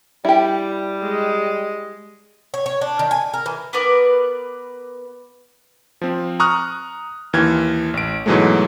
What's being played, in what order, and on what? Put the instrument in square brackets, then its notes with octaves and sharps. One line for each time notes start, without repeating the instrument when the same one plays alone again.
[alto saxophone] G3 [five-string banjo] E4 G4
[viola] G#3 D#5
[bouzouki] C#5
C#5
D4
D#3
G#5
A#4
E3
[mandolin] B3 A#4 B4 D5
[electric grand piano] F3 C4
A#5 C#6 D#6 F6 F#6
D#2 E3 F6 G#6
A1 D7
G#2 B2 E3 F#3 G#3 A3